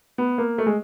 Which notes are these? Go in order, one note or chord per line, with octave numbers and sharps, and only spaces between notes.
B3
A#3
A3
G#3